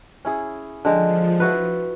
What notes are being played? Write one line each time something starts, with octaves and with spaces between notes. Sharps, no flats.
C#4 E4 G#4
D3 F3 G#3 G5
E4 F#4 B4